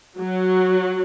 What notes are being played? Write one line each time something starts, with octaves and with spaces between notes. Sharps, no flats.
F#3